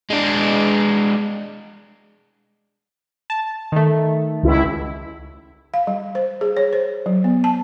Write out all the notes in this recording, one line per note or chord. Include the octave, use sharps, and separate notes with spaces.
G#3 D4
A5
D#3 A3
C#2 E4
F5
G3
C5
G#4
C#5
C5
F#3
B3
A5